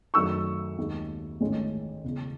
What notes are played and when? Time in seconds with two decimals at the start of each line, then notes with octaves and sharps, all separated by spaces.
0.14 F#2 D#3 A3 D#4 C#6 E6
0.78 D#2 D#3 G#3
1.41 A1 G#2 D#3 G#3 C#4
2.04 E1 E2 C#3